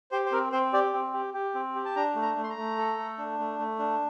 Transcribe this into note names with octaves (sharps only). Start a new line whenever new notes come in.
G4 C5
C5
C4 A#4
C4 C5
G4 D5
C4
G4
G4
C4
G4
A5
D4 A#5
A3
A#5
A3
C6
A#5
A3
A4
A3
D4
A3
A3
D4